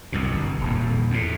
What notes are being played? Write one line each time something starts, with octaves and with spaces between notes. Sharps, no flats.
C2 F#2 B2
G1
D#1 F2
E2 A2